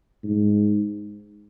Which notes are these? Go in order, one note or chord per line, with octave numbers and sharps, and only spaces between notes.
G#2